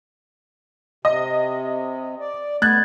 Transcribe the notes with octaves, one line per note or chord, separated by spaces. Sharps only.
C3 D#5
D5
A3 B3 F#6 G#6 A6